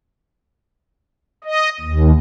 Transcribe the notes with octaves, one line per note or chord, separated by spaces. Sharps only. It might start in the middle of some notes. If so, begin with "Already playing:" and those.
D#5
D#2